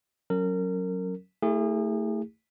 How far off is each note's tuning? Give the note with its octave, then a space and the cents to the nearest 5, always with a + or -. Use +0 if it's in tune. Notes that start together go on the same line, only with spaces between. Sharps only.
F#3 +0 C#4 +0 A#4 -30
A3 +20 E4 -30 G#4 -35